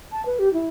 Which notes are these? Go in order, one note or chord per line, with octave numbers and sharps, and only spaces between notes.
A5
B4
G4
E4